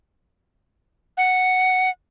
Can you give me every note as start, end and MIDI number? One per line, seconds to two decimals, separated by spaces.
1.17 1.90 78